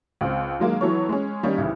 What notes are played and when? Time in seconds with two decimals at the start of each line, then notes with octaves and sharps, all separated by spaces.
0.21 C#2 C4
0.59 D#3 F#3 G#3 A#3
0.81 E3 F#3 B3 A4 C#5
1.09 G#3 C#4
1.43 D#3 G3 A#3 C#4 D#4
1.58 C2 A2 C#3 E3